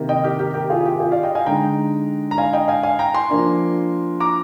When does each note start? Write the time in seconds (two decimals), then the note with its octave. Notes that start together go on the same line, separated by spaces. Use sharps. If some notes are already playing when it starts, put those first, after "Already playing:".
Already playing: C3 D#3 A#3
0.09 D#5 G5
0.24 G4 A#4
0.39 G4 A#4
0.54 G4 A#4
0.70 F4 G#4
0.80 G#4
0.85 G4
1.00 F4 G#4
1.12 D5 F5
1.23 D#5 G5
1.35 F5 G#5
1.46 D3 G#3 D#4 G5 A#5
2.31 A#5
2.38 F5 G#5
2.53 D#5 G5
2.68 F5 G#5
2.83 F5 G#5
2.99 G5 A#5
3.14 G#5 C6
3.30 F3 A#3 D4
4.20 A#5 D6